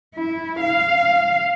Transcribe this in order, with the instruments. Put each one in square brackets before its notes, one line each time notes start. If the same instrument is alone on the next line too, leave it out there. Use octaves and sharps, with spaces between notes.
[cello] E4
F5